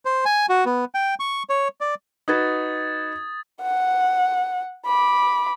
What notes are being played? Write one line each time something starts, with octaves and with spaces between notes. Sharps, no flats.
C5
G#5
F#4
B3
G5
C#6
C#5
D5
D#4 F#4 B4 D#6 G#6 A6
F#5
B5 D6